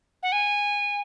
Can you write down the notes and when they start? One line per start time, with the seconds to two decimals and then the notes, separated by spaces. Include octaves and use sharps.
0.23 F#5
0.32 G#5